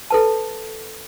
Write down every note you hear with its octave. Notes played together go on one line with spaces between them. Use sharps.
A4 B4 A5